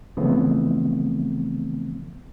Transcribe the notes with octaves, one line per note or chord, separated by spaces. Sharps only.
C#3 E3 F3 A3 B3 C4